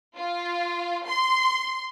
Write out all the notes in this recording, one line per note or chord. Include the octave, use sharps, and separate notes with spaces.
F4
C6